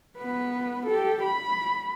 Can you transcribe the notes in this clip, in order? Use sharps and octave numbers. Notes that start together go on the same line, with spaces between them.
B3 B4
G4 A4
B5